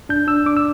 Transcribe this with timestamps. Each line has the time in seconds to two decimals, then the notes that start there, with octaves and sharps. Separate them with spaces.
0.09 D4 G6
0.27 D4 E6
0.46 D4 D6
0.57 E6